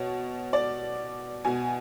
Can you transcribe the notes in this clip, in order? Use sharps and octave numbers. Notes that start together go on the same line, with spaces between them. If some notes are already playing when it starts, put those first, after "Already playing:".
Already playing: B2 C#5
D5
B2 G#5